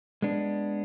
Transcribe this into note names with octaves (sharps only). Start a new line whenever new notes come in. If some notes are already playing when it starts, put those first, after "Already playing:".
G#3 B3 D4